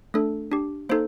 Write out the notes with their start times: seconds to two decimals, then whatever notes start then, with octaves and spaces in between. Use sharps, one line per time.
0.14 A3 D4 A4
0.52 D4 G4
0.89 A#3 D#4 A4 C5